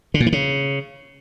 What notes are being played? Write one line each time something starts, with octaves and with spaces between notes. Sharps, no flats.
D3
A#2
E3
C#3